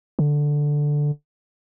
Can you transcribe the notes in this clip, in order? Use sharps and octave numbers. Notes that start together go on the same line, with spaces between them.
D3